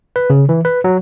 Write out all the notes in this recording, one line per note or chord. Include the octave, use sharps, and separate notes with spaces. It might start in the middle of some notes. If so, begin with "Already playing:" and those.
B4
C#3
E3
B4
F#3